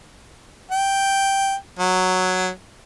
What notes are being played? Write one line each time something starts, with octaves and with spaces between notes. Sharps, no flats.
G5
F#3